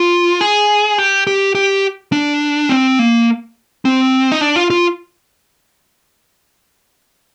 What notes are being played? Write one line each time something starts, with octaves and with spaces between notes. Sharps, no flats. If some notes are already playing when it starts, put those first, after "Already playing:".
Already playing: F4
G#4
G4
G4
G4
D4
C4
A#3
C4
D#4
D4
F4
F4